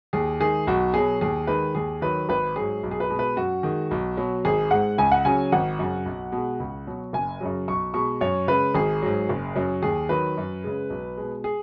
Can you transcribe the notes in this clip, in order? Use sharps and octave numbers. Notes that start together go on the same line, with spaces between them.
D#2 G#4
D#3 G#3 G#4
B1 F#4
B2 F#3 G#4
D#2 G#4
D#3 G#3 B4
D#2 G#4
D#3 F#3 B4
G#1 B4
G#2 F#3 G#4
B1
G#4
B4
B2 G#3
B4
F#2 F#4
D#3 G#3
B1
B2 F#3
G#1 G#4
G#2 G#3 F#5
C#2 G#5
F#5
C#3 F#3 G#5
G#1 F#5
F#2 C#3
B1
B2
G#3
C#2
B2 F#3
F#1 G#5
F#2 C#3 F#3
B1 C#6
B2 G#3 C#6
F#2 C#5
C#3 G#3 B4
G#1 G#4
G#2 F#3
F#1
F#2 C#3 F#3
D#2 G#4
D#3 F#3 B4
F#2
C#3 G#3
B1
B2 G#3
G#4